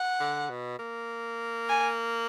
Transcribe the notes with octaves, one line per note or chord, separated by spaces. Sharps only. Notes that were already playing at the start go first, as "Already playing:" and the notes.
Already playing: F#5
D3
B2
A#3
G#5